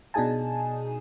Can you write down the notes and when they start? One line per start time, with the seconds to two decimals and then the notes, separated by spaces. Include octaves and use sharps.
0.14 B2 D4 D#4 G#4 G#5 A5